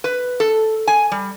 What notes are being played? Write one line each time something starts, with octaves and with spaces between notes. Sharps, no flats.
B4
A4
G#5
G3